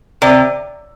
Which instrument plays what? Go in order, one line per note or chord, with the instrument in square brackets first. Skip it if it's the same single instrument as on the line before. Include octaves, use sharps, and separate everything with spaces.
[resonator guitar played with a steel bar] C3 [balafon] D5